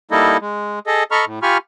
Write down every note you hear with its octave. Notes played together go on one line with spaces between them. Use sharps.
G3 A#3 D#4 E4 A4 D#5
G#3
G#4 A4 D#5
A4 D#5 A#5 B5 C#6 F6
A2
F4 G4 G#5 B5 C#6 F6